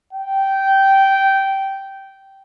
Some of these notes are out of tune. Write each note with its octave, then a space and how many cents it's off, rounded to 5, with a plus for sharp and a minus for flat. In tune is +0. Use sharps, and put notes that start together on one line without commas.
G5 -15